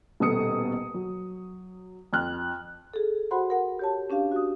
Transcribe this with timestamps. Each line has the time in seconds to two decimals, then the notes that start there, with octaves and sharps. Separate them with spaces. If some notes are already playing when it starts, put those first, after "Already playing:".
0.20 D#1 B2 A4 D#6 C#7
0.94 F#3
2.13 F2 F6 F#6
2.94 G#4 A4
3.31 F#4 C5 F#5 B5 C6
3.50 A#4 F#5
3.79 G4 C#5 A5
4.10 C#4 D4 G4 F5
4.32 F#4 D#6